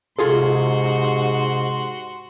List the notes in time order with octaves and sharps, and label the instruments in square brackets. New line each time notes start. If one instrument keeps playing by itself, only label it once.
[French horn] G#2 [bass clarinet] C3 [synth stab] F4 G#4 A4 [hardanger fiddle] F#4 C6